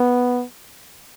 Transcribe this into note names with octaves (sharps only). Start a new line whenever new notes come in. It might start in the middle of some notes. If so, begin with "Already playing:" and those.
Already playing: B3